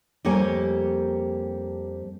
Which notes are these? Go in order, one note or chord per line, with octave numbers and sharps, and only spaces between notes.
F2 G3 A#3 G4 C#5 G#5